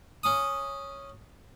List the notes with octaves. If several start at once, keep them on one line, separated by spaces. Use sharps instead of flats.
C#4 D#6